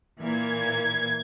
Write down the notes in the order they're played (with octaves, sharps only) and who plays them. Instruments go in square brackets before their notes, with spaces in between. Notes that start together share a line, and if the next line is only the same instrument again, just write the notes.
[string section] A#2 E3 A#3 [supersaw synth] G#6